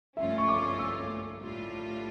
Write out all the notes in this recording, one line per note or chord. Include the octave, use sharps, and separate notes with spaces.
G2 F3 A3 C#4 F4 E5
C#6
D6
E6
A2 G3 D4 F4